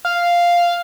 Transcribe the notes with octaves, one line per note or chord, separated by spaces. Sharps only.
F5